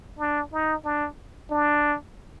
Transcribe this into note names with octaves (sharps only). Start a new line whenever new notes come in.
D4
D#4
D4
D4